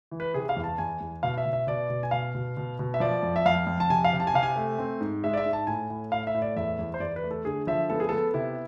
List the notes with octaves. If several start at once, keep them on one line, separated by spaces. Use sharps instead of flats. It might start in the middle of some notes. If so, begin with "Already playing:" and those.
E3
B4
C3 G#4
F5
E2
A5
E2 G#5
E2
B2 F5
E5
B2
E5
B2 D5
B2
G#5
B2 F5
B2
B2
B2
E5
F3 D5
F2
E5
F2 F5
F2
A5
C3 G#5
F5
C3
A5
G#5
C3 F5
G#5
A3
C4
G#2
G#3 E5
D5
E5
G#2
A5
A2 G#5
A2
A2 F5
E5
A2
D5
E2 E5
E2
C5
E2 D5
B4
A3
A4
D3 G#4
F3 E5
B3 A4
G#4
B3 A4
C3 E4